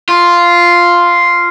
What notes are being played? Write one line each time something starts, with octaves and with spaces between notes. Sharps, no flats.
F4